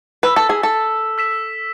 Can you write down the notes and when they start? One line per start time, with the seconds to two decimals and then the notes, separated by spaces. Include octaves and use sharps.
0.23 B4 E6 B6 E7
0.36 A4
0.49 G#4
0.63 A4
1.18 E6 B6 E7